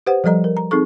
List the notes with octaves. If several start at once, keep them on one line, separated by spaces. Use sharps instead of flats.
G4 B4 C5 F#5
F3 G3 A4 D#5 A#5
A#4
A#5
C4 D#4 G#4 A4 C#6